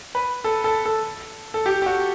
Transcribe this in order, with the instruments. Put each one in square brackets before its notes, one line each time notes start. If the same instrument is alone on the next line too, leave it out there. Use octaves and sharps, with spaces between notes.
[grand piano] B4
A4
A4
A4
A4
G4
G4
F#4